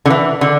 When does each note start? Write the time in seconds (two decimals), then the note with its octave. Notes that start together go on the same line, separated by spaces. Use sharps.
0.06 D3
0.10 E3
0.41 D3